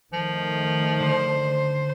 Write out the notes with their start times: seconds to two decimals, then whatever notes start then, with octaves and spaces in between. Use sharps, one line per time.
0.13 D#3 F3 A3
1.00 D3 C5